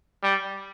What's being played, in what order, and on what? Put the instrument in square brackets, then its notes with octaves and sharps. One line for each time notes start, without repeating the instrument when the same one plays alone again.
[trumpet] G3